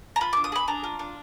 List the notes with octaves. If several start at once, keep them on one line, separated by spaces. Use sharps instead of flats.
A#5
F4 B5
D4 D6
D#6
G#4 B5
D4 A#5
F4
D4